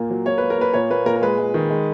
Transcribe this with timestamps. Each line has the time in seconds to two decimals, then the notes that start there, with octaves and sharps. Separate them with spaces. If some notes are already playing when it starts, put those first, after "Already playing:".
Already playing: A#2 A#3
0.10 F#3
0.26 A#3 C#5
0.38 A#3 B4
0.50 A#4
0.58 A#3 B4
0.73 A#2 C#5
0.90 A#3 B4
1.06 A#2 A#4
1.16 A#4
1.22 G#3 B4
1.38 G#3
1.54 D#3
1.70 G#3